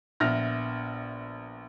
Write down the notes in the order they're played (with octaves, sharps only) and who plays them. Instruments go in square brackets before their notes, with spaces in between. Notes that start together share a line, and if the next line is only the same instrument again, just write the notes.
[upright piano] A#1 B3 E5 F6 A#6